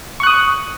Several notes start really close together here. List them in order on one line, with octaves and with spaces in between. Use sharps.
C#6 F#6 D#6